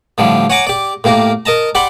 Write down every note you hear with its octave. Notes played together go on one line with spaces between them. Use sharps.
A2 D3 F3 G3
C#5 F#5 G#5 A#5 C#6 D6
G4 D5
A2 A#3 G4 A#4
A#4 D#5 A5 A#5
G4 D5 F#5 B5 C6